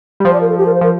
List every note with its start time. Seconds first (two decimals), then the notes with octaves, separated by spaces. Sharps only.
0.20 G3
0.25 F3 C5
0.33 D5
0.41 A#4
0.49 A4
0.58 G4
0.66 A#4
0.74 C5
0.81 F3 A#4